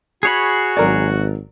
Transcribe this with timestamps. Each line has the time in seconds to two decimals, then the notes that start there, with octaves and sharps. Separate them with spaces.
0.23 F#4 G#4 C#5 B5
0.77 G#1 F#3 A#4 D5